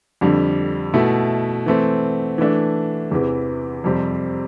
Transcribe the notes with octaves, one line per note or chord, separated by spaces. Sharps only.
F2 D3 G3
B2 A3 E4
E3 A3 C4
E3 A3 D4
E2 C3 E3
F2 C3 G3 C4